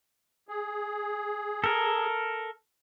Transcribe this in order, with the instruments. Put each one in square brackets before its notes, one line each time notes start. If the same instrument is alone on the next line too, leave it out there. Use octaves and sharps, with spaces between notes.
[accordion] G#4
[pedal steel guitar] A4 A#4